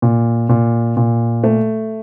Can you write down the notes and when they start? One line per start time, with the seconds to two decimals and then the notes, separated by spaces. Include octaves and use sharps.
0.02 A#2
0.49 A#2
0.97 A#2
1.44 A3